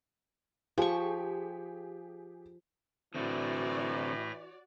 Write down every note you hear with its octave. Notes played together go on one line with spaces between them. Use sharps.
F3 G4 G#4 C#6
A2 D3 E3 A3 C4 F#4 D5 A#6